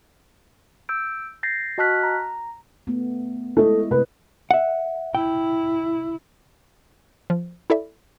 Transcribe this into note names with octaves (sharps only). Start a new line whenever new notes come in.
E6 G6 D7
G6 A6 A#6 C7
F#4 D#5 A5 F6 F#6 B6
A#5
A3 B3
G#3 A3 E4 D#5
C3 A3 C4 B4
E5 F#5
E4 G5
F3
E4 A4 D5 E5